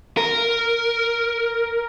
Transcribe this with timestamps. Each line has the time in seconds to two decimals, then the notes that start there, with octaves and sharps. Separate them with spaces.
0.17 A#4